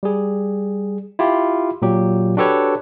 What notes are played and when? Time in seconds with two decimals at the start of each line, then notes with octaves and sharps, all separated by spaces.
0.03 G3 G#4
1.19 E4 F4 G4
1.82 A#2 F#3 G4
2.37 D4 F#4 G4 A4 B4 C#5